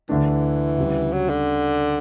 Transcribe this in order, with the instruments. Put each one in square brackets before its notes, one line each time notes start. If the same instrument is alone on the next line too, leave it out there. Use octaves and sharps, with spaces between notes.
[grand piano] D2 D3 A3 D4 [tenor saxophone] E3
[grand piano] D2 C#3 G3
[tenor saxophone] F#3
D3